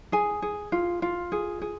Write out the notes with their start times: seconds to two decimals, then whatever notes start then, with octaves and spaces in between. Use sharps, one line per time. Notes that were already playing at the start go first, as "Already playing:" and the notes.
0.12 G#4 G#5
0.42 G#4
0.72 F4
1.02 F4
1.32 G#4
1.62 G#4